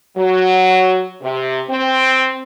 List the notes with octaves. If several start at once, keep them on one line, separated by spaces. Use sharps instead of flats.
F#3
C3
C4